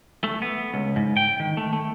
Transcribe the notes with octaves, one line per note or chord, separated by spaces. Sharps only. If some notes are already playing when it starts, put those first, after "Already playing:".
A3
B3
C#2
G#2
G5
D#3
A3
A3